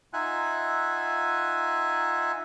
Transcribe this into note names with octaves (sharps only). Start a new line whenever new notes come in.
D#4 F4 E5 F#5 G#5 F#6